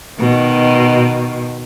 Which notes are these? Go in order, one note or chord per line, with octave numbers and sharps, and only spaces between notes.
B2 D#3